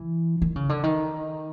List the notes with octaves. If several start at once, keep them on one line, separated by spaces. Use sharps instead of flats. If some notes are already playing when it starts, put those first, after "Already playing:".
Already playing: E3
D#3
C#3
D3
D#3